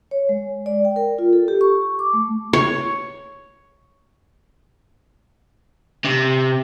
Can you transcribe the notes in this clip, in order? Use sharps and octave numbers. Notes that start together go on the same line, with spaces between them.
C#5
G#3
D5
G5
A#4
F4
A4
G4
C#6
D6
A3
C#5
C3